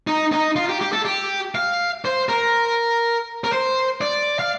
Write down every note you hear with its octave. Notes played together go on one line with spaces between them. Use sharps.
D#4
D#4
F4
G4
G4
A4
G4
F5
C5
A#4
A#4
C5
D5
F5